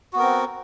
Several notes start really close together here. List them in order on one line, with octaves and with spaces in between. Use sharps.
F#4 B3 A#4 C4